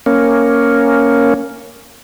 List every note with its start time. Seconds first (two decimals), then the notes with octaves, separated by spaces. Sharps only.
0.06 A#3 C#4